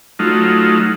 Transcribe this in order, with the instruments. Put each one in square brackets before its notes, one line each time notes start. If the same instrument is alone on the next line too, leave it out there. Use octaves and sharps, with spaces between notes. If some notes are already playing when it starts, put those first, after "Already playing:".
[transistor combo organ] F#3 A3 D#4 F4